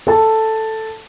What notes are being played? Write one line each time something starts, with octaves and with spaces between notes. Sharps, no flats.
A4 A5